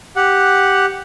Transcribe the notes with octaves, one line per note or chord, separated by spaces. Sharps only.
G4 F#5